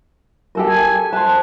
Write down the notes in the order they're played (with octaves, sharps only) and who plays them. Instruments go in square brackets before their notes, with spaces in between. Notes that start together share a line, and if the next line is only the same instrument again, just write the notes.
[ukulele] G4 A4 A#4
[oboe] G#5
[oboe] B4 [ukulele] C5 A5